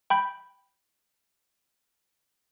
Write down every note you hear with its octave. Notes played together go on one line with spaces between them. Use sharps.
G5 B5 G6